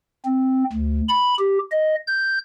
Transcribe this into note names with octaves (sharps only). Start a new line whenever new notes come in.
C4
D2
B5
G4
D#5
G6